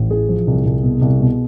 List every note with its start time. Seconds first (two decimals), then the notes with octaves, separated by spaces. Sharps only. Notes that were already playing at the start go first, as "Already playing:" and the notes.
Already playing: A1
0.11 E3 G#4
0.29 F3
0.47 C2
0.65 C2
0.83 B2
1.01 C2
1.20 B2